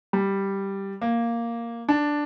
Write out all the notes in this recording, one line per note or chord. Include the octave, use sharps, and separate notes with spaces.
G3
A#3
D4